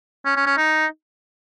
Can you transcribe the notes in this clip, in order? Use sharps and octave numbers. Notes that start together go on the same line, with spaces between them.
C#4
C#4
C#4
D#4